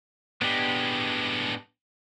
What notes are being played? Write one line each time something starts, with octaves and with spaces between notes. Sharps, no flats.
A2 G#3 B3 D4 G4